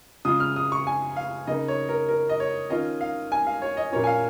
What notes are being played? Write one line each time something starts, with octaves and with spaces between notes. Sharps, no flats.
C#3 G#3 F4 D#6
F6
D#6
C#6
G#5
F5
C#3 A#3 D#4 D#5
C#5
A#4
A#4
D#5
C#5
D#3 C#4 F4 D#5
F5
G#5
F5
C#5
D#5
A#2 A#3 C#4 C#5
G#5
F5